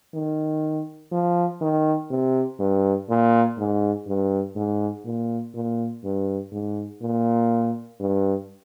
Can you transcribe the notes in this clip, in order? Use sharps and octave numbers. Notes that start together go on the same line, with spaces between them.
D#3
F3
D#3
C3
G2
A#2
G#2
G2
G#2
A#2
A#2
G2
G#2
A#2
G2